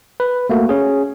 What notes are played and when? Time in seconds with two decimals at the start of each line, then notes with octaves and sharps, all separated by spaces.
0.20 B4
0.50 A3 A#3 F#4
0.69 C#4 G#4